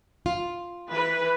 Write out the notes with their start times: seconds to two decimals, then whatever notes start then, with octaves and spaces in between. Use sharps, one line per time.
0.26 F4
0.90 E3 B4